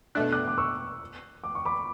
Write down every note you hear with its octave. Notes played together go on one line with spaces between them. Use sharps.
B2 A3 D4 F#6
D6 F#6
D6
C#6 E6
D6
C#6
B5 D6